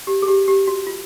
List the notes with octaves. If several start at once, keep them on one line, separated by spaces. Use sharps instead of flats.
G4
G#4
G4
G4
F#4
F4